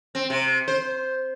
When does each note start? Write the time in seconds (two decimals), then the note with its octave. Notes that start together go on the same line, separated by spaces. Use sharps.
0.15 C4
0.30 C3
0.68 C5